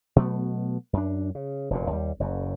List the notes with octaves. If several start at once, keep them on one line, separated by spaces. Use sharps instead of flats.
B2 F#3 A3 B3
F#2 D4
C#3
F1 F#2 A#2
D#2 G3
F#1 F#2